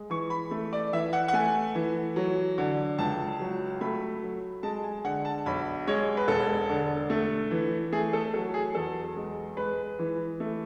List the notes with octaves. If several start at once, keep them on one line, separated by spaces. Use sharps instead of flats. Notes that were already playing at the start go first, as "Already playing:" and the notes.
Already playing: G#3
E3 C#6
B5
A3
D5
E3 E5
F#5
F#5
A3 G#5
E3
F#3
D3
C#2 A5
F#3
A3 B5
F#3
G#3 A5
G#5
D3 F#5
A5
B1 B5
G#3 C#5
B4
E1 A4
D3
A3
E3
A3 G#4
A4
F#3 A4
G#4
E2 A4
G#3
G#3 B4
E3
A3